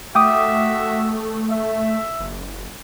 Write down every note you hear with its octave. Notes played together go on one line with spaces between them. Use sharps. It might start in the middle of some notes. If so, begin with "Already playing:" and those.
A3 F#4 E5 G5 D6 D#6
E5
F#1